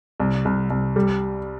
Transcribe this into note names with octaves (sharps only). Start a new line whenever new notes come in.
C2
C2
C2
G3